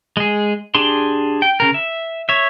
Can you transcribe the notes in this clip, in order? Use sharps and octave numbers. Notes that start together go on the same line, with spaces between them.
G#3 G#4
D4 G4 G#4 C6
G5
C#3 A#4
E5
C#5 E5